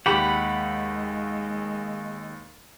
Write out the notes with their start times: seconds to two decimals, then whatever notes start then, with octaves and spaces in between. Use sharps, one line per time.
0.06 D#2 G#3 G4 F#5 B5